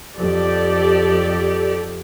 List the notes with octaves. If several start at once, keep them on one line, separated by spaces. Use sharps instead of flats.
F2 G4 A4 D5